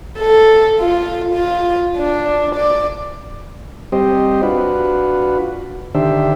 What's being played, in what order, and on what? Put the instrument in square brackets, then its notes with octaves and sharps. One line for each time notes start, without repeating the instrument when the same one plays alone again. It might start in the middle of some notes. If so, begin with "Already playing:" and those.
[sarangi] A4
F4
F4
D4
D5
[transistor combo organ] G3 C4 G4 C5 D#5
D4 F4 F#4 B4
D3 D#3 D4 G4 C5 E5